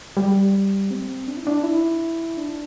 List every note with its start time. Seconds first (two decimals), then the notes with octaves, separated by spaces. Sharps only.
0.17 G3
0.91 C4
1.27 D4
1.37 E4
1.47 D4
1.63 E4
2.37 D4